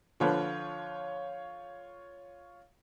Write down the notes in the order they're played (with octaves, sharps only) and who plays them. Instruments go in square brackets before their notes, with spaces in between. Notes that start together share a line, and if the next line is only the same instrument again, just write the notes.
[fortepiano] D3 F3 B4 [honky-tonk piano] F4 C#5